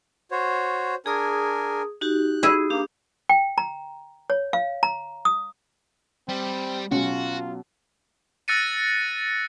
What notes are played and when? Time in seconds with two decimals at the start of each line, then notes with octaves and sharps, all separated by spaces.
0.31 F#4 C5 C#5
1.06 D4 G#4 A#4 G#5 D#6
2.01 D#4 F#4 G4 F#6
2.43 E4 G#4
2.70 A#3 D4 G4
3.29 G5
3.58 A#5
4.30 C#5
4.53 F5
4.83 A#5
5.25 D#6
6.29 G3 C4
6.92 B2 F#3 C#4 F4 F#4
8.48 E6 F#6 A6 A#6 C#7 D#7